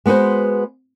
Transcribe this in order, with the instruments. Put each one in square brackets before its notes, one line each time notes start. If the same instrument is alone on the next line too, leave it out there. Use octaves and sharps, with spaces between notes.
[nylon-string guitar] G#3 B3 F#4 B4 C5